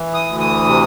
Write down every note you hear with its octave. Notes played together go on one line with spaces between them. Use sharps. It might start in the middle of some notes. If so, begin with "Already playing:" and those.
Already playing: E3
D#6
D2
D#6
C3